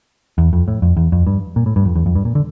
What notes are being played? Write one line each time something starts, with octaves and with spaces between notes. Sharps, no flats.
E2
F2
A2
F2
E2
F2
G2
A#2
A2
G2
F2
E2
F2
G2
A#2
D3